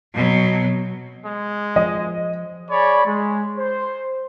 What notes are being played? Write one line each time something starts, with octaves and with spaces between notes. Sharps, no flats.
B2 F#3
G#3
F3 D#5
G#4 C#5 D5 B5
G#3
C5